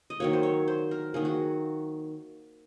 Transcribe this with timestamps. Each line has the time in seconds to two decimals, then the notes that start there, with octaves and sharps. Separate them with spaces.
0.10 D#5
0.20 D#3 F#3 A#3 C#5
0.33 C5
0.43 C#5
0.68 C5
0.91 A#4
1.14 D#3 F#3 A#3 G#4
1.25 F#4